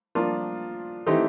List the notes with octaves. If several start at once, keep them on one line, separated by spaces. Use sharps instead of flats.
F3 A#3 D4 F4
E3 A3 C4 D#4 G4